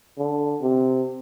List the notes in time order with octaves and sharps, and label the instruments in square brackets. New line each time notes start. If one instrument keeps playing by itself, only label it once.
[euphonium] D3
C3